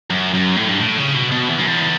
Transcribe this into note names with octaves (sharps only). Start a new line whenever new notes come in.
F#2
F#2
A2
G2
A2
C#3
B2
B2
E2
F#2
E2